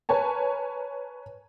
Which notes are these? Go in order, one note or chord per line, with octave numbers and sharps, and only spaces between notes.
A#4 B4 C#5 G#5 A5